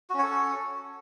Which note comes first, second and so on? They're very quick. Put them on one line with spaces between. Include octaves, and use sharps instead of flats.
F#4 C#4 C#5 A4